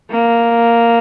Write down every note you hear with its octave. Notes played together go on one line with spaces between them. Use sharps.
A#3